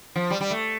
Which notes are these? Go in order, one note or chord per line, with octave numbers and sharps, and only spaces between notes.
F3
G3
G3
A3